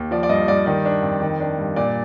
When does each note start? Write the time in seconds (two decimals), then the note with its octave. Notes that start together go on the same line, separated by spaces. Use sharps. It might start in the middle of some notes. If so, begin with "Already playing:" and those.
Already playing: D#2
0.11 F3 D5
0.23 D5
0.29 G2 D#5
0.48 G2 D5
0.66 D#3 D5
0.85 D4
1.03 F2
1.22 D#3
1.40 D4
1.58 G2
1.76 A#2 D5